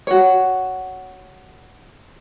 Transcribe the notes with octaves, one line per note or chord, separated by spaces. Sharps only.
F#4 C#5